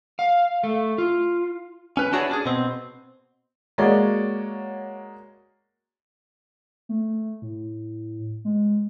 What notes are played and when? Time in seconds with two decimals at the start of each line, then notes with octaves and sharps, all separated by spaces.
0.19 F5
0.64 A3
0.98 F4
1.97 C#4 B4
2.13 D4 E4 F#4 G#4 C#5 D5
2.29 C#4 D4 G#4
2.46 B2 C4
3.78 G#3 A#3 F#4 C#5 D5
6.89 A3
7.42 A2
8.45 G#3